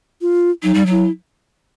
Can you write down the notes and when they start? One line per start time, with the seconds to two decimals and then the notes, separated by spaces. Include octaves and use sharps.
0.22 F4
0.63 F#3 D#4
0.74 G3
0.86 F#3 E4